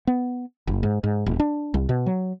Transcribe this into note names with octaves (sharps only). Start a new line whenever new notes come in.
B3
F#1
G#2
G#2
D#1
D4
C2
B2
F#3